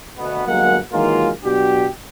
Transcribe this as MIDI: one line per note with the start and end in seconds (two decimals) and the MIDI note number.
0.17 0.43 38
0.17 0.43 47
0.17 0.43 59
0.46 0.77 31
0.46 0.77 54
0.46 0.77 56
0.46 0.77 58
0.46 0.77 70
0.46 0.77 78
0.92 1.30 51
0.92 1.30 52
0.92 1.30 54
0.92 1.30 56
0.92 1.30 58
0.92 1.30 65
1.44 1.87 47
1.44 1.87 54
1.44 1.87 62
1.44 1.87 66
1.44 1.87 67